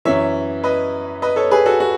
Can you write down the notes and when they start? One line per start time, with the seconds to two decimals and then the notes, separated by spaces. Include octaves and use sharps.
0.05 F#2 E3 C#5 E5
0.64 B4 D#5
1.22 B4 D#5
1.36 A4 C#5
1.51 G#4 B4
1.66 F#4 A4
1.80 F#4